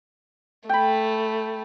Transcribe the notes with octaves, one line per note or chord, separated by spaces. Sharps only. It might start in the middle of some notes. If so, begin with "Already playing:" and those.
A3 G5 B5